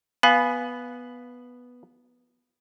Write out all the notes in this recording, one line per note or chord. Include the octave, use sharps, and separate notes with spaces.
B3 F5 G#5 B5